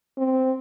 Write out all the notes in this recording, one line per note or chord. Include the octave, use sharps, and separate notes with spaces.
C4